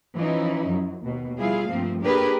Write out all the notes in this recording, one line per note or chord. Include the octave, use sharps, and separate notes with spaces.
E3 F3 C#4 D#4 E4
F#2
D#2 B2
F3 G3 E4 F4 G#4 F5
G2 F3 A3 A#3 C4
A#3 D4 G4 G#4 A#4 B4